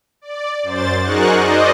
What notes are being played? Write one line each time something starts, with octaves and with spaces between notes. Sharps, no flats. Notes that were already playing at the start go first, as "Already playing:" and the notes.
D5
F#2 C5 A6
D#4 F#4 G#4 A#4 C#6 F#6
C5 D5 D#5